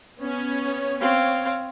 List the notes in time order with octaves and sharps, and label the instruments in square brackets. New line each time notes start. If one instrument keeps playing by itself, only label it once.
[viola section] B3 C#4 C#5
[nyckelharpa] C4 F5 [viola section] C#5